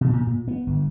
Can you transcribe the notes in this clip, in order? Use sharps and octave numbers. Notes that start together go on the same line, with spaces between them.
B2
A#2
A#2
B3
G1